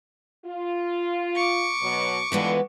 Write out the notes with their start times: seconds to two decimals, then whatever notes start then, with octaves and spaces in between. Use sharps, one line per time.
0.46 F4
1.36 C#6 D6
1.83 B2 F#3
2.32 G2 D3 E3 F3 G#3 B3